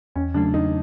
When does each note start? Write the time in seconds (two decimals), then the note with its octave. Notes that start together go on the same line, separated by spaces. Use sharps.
0.15 E2 C#4
0.34 C#3 F#3 A3 D4
0.54 E2 D#4